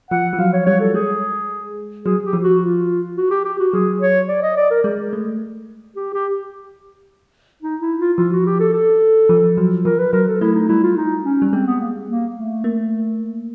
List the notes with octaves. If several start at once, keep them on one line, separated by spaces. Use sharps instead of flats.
F3 F#5
F3
F#3 F5
C#5
G3 C#5
A4
G#3 G#4
F#3 G#4
G4
F3
F#4
F4
F#4
G4
G4
F#4
F#3 G#4
C#5
D5
D#5
D5
A#4
G#3
A3
G4
G4
D#4
E4
F4
F3 F4
F#4
G4
A4
A4
F3
F#3
F3 A#4
B4
F#3 A#4
A4
A3 E4
D#4
G3 E4
F4
D#4
C#4
G3
G#3 C4
B3
A#3
A#3
A3
A#3